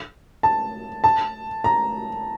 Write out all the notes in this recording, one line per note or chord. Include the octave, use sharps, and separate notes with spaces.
A5
A5
A#5